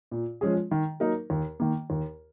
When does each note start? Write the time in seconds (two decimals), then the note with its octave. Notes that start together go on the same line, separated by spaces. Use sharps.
0.11 A#2
0.41 F3 G#3 C#4 G#4
0.71 D#3
1.00 F#3 A#3 D#4 A#4
1.30 D#2
1.60 D#3 A#3
1.90 D#2